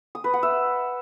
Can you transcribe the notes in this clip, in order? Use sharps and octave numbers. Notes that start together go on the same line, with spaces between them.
D#6
B4
F#5
E5